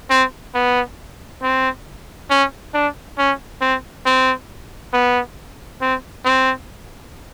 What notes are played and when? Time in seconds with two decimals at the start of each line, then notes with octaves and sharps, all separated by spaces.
0.10 C4
0.54 B3
1.43 C4
2.30 C#4
2.74 D4
3.18 C#4
3.61 C4
4.06 C4
4.93 B3
5.81 C4
6.25 C4